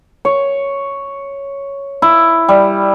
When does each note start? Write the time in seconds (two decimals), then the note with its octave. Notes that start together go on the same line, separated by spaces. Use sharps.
0.25 C#5
2.02 E4
2.48 G3